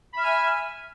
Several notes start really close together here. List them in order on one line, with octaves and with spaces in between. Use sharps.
B5 E5 F6 G#5